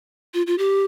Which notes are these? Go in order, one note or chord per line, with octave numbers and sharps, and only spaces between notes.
F4
F4
G4